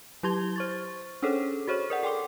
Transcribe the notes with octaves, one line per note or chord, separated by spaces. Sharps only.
F#3 E4 G4 C6 G#6 G7
C5 C#6 A6
C#4 D4 G#4 A4 C5 C#5
F#4 G#4 C5 C#5 C#6
A#4 D5 F#5
A4 G5 C6 D6